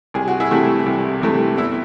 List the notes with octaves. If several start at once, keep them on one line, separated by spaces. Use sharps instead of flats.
C2 G#4
F#4
E4 G#4
C3 E3 A3
C2
C3 E3 A3
E2 E4